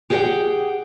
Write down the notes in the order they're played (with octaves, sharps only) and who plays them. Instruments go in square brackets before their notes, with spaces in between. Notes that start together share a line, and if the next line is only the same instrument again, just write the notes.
[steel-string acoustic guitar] G4 G#4 C#5 E5 F#5 G5